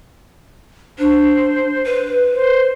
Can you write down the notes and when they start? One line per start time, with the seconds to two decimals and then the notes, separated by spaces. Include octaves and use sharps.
0.99 D4 C5
1.86 B4
2.34 C5